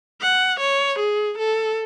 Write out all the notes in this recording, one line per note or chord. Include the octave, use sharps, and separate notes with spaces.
F#5
C#5
G#4
A4